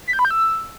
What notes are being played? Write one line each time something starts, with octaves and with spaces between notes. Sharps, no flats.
B6
G6
B5
G6
E6